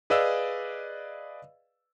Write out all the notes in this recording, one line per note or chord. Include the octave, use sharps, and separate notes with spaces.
G#4 B4 D5 D#5 F5 E6